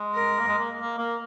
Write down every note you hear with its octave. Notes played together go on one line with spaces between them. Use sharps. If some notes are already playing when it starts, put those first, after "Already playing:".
Already playing: G#3
A#4
A#3
G#3
A#3
A#3
A#3